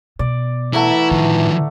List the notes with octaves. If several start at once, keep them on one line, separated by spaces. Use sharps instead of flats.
B2 D5
E3 A3 E4 F#5 A#5
A2 D#3 F3